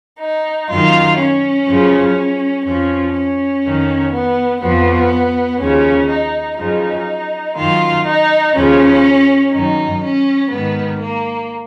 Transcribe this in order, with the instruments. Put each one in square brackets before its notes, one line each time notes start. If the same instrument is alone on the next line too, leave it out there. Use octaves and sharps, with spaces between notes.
[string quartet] D#4
F#2 D#3 F4
C#4
F#2 C#3 F3
F2 F3 C#4
C#4
F2 D#3
B3
F2 F3 B3
D#2 C#3 F3 C#4
D#4
F#2 C#3 F3 D#4
F#2 D#3 F4
D#4
D#2 C#3 F3 C#4
F#2 D#3 D#4
C#4
G#2 D#3 B3
A#3